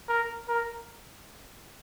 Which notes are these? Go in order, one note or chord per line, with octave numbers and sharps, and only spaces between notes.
A#4
A#4